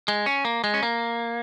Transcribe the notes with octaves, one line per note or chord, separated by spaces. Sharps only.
G#3
C#4
A#3
G#3
C#4
A#3